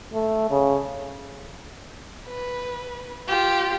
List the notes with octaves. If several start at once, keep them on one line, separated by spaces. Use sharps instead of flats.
A3
C#3
B4
F4 G4